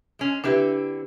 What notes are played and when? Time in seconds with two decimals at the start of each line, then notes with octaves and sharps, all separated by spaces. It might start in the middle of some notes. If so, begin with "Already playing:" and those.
0.19 G#3 C#4
0.44 D3 C4 D4 E4 G4 B4